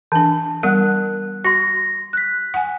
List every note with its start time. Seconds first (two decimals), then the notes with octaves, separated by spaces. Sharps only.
0.12 E3 D4 A5
0.63 G3 B3 A#4 F#5 F#6
1.44 F#4 C6 A#6
2.13 F#6 B6
2.54 F#5 G#5